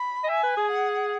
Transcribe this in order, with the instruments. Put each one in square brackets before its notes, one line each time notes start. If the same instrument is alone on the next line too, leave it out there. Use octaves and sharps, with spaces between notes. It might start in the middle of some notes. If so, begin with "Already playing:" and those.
Already playing: [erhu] B5
[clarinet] D#5
[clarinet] E5 [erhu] G#5
[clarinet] B4
G#4
[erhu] F#5